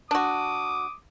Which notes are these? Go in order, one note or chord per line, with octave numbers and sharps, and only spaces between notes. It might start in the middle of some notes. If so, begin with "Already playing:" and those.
D4 F#4 D6 D#6